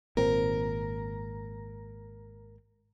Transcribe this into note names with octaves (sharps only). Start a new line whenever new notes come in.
G#1 A#2 C4 A#4